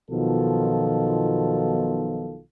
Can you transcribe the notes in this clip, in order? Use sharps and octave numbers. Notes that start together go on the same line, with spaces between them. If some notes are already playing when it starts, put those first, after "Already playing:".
B1 B2 D#3 F3 F4 A4